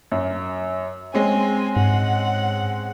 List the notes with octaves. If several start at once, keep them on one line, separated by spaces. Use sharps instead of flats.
F#2
G#3 C4 C#4 G#5
G#2 F#5